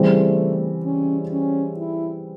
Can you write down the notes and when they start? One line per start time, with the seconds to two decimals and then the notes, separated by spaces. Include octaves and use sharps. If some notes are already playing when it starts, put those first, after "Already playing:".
Already playing: C#3 E3 G3 A3 C4
0.85 C#4
1.31 C#4
1.77 E4